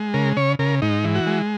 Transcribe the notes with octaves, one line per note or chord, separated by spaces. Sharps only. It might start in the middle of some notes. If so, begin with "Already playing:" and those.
Already playing: G#3
C#3 A#4
C#3 C#5
C#3 A#4
G#2 D#4
E3
F#4
G#3